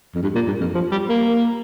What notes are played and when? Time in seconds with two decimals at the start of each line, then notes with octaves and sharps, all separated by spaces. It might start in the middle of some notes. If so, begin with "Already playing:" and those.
0.15 F2
0.23 G2
0.35 A#2
0.47 G2
0.60 F2
0.74 F3
0.91 G3
1.09 A#3